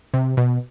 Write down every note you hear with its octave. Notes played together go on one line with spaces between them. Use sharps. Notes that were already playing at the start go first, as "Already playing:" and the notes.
C3
B2